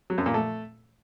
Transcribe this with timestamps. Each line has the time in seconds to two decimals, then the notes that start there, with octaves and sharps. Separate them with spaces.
0.10 F#3
0.18 F#2
0.26 A#2
0.34 A3